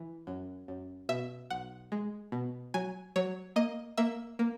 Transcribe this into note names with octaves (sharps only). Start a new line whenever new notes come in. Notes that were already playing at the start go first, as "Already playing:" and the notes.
Already playing: E3
F#2
F#2
B2 E5
B1 F#5
G#3
B2
F#3 G#5
F#3 C#5
A#3 D#5
A#3 E5
A#3